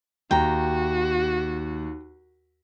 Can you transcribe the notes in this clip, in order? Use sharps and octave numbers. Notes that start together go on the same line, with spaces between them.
D#2 F#4 G5 A#5